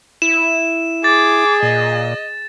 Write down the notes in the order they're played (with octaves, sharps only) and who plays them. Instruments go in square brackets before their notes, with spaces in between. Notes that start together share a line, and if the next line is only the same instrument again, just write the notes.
[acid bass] E4 [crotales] E7
[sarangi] G#4 [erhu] D6 [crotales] A6
[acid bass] A#2 [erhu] D#5